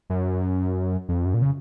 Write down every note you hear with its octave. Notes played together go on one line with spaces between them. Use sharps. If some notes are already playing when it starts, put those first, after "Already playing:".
F#2
F2
F#2
A#2
C#3